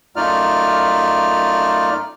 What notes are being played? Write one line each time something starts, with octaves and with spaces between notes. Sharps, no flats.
F#2 A3 D#4 F4 D5 F6